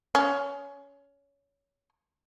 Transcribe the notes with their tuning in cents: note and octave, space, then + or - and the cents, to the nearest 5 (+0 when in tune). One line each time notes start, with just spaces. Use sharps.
C#4 +20